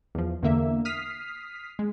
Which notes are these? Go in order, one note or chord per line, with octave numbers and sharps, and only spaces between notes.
E2 F3
E2 D3 A#3 E5
D#6 F6 B6 C7
G#3